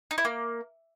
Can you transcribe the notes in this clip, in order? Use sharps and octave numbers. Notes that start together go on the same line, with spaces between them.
D#4
E4
A#3